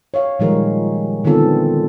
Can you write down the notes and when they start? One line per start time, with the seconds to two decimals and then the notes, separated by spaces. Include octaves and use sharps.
0.14 C#5 F5
0.39 A#2 D#3 F3 G3 G#3 A#4
1.24 D3 D#3 B3 C4 F4 A4